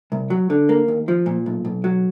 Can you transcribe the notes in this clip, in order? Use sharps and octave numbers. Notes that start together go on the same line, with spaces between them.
C2
F#3
D3
A#3
D#2
F3
A#2
B1
B1
F#3